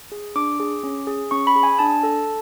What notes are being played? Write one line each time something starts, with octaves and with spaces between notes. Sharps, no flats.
G#4
D4 D6
G#4
C#4
G#4
C#4 C#6
B5
G#4
G#5
D4 A5
A4